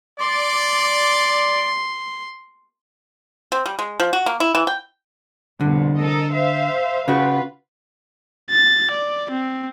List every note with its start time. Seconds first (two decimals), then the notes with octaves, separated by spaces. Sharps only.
0.20 D5 C6
3.52 C4
3.66 G3
3.79 G#3
4.00 F3
4.13 F#4
4.26 A#3
4.40 E4
4.55 E3
4.67 G5
5.61 C2 F2 B2 D3
5.99 A4 A#4 D#5
6.33 C5 E5 F5
7.08 C#3 F4 F#4 B4
8.51 A6
8.91 D5
9.31 C4